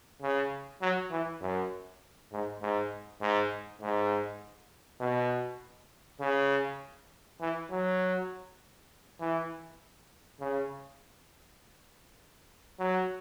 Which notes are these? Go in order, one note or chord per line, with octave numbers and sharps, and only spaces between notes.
C#3
F#3
E3
F#2
G#2
G#2
G#2
G#2
B2
C#3
E3
F#3
E3
C#3
F#3